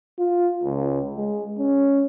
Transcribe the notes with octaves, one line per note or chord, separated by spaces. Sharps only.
F4
C#2
G#3
C#4